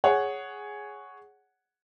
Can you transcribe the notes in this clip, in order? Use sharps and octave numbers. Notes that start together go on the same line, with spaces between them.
G#4 C#5 F#5